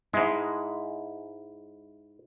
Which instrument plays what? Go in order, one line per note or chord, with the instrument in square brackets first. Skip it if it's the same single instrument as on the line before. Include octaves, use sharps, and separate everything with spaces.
[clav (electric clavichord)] G#2 G#3 [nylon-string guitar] E4